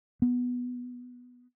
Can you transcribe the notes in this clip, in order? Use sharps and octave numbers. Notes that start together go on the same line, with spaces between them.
B3